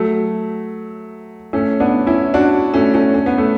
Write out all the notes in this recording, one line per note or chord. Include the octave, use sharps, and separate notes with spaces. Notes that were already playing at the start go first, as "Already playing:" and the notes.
Already playing: F#3 A3
A3 C#4
B3 D4
C#4 E4
D4 F#4
A3 C#4
A3 C#4
C#4
B3
A3